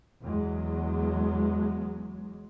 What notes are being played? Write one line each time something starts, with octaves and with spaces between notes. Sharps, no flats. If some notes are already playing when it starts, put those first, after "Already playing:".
E2 F#3 G#3